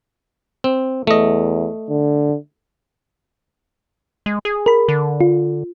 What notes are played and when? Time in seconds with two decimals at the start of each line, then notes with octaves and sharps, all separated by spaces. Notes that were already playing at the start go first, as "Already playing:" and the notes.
0.64 C4
1.07 E2 A3 D#5
1.90 D3
4.26 G#3
4.45 G#4
4.66 A#4 B5
4.88 D3
5.21 F4